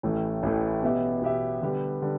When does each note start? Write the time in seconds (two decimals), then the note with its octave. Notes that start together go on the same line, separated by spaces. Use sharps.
0.03 A1 A2 E3 A3
0.43 A1 A2 E3 A3
0.83 B2 B3 G4 E5
1.21 B2 B3 G4 E5
1.62 D3 G3 B3 G4
2.02 D3 G3